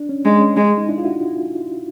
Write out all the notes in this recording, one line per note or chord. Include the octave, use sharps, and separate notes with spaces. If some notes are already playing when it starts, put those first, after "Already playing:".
Already playing: D4
C#4
G#3 D4
C#4
G#3
D#4
D4 E4
F4
E4 F#4